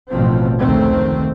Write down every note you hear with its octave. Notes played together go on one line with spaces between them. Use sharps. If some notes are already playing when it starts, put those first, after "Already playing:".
A1 D2 B2 F3 C4
F1 C#2 D3 D#3 A3 C4